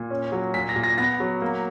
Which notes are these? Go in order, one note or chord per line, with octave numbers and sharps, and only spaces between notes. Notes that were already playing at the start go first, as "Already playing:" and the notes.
Already playing: A#2
C#4
F#3
A#2 B6
A#6
A#2
A#6
B3 A#6
F#3
A#3